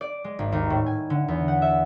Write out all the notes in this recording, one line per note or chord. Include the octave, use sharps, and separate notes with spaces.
D5
G#3
G#1
D#2
A2
G#5
D3
E2
F#5
E5